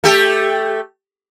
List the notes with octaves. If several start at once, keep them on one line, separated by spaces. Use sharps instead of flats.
A3 G4 A4